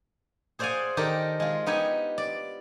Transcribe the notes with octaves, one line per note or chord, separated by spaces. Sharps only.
G#4 C5 D5 F5 F#5 G#5
D#3 G4 A4 A#4 D5
G#3 F4
B3 D#4 G4 G#5
D5